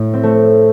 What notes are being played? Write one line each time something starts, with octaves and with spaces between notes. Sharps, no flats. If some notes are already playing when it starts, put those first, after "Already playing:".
Already playing: A2
C4
A3